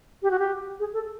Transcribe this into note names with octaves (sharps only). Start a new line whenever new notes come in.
G4
F#4
G4
G#4
A4